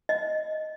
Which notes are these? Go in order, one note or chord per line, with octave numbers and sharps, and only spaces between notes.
D#5